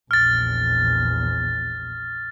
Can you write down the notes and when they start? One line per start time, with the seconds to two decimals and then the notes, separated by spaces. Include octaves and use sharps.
0.11 A#1 E2 F6 A6